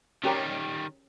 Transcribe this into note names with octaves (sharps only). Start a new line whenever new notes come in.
D#3 G3 C#4 G4 A#4